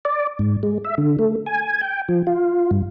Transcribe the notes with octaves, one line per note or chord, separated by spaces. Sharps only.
D5
G#2
G#3
E5
D3
A3
G#5
G5
F3
F4
G2